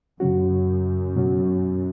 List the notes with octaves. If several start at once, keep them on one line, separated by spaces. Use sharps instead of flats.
F#2 C#3 F#3 C#4 F#4
B2 F#3 C#4 F#4